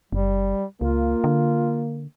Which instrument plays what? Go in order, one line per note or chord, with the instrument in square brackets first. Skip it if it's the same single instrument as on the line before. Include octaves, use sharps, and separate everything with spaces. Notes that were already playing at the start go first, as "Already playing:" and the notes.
[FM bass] F#1 [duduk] G3
[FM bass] C#2 [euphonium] A#3 [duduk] F4
[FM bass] D3